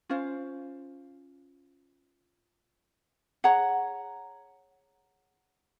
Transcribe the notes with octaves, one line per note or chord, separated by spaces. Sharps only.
C#4 F4 C5 F5
G#4 C#5 F#5 A#5